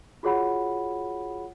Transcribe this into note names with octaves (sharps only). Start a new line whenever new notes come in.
F4 F#4 G#4 C#5 F#5 B5